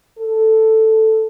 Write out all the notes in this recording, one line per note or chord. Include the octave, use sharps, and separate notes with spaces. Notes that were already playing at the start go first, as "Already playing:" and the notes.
A4